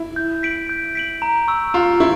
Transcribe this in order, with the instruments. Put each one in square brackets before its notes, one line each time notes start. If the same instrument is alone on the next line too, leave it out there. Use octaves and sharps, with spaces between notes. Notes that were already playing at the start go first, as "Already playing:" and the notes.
Already playing: [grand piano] E4
[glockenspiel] G6
B6 D7 F#7
G6
B6 D7 F#7
A#5
C#6 E6 G6
[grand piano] F4 [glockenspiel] A#5
[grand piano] E4 [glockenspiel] C#6